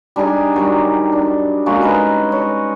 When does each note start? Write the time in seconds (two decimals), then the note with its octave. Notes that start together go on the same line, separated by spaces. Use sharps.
0.16 G3 D4 D#4 G#4
0.54 D#3 F#3 G3
1.12 D4
1.66 G#3 A#3 C#4 F#4
1.81 D#4 B4 D#5
2.32 C#5